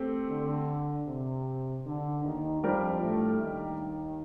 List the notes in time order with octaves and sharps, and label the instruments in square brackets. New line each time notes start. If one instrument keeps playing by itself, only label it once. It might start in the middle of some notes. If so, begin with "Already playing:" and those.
Already playing: [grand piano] A3 C4 G4
[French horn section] D3
C3
D3
D#2 D#3
[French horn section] F2 F3 [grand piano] G3 D4 G4 A#4
[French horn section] A2 A3
D#2 D#3